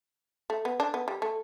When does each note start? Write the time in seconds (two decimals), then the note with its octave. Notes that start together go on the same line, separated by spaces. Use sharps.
0.50 A3
0.65 B3
0.80 D4
0.94 B3
1.08 G3
1.22 A3